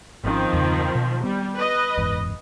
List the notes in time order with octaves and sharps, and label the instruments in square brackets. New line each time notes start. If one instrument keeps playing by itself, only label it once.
[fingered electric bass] G#1 C#4 [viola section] D#3 F3 C4
[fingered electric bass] E2 G2 C#3
B2
[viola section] G3 [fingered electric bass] B3
[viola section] B4 D#5
[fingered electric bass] F#1 E2 G#2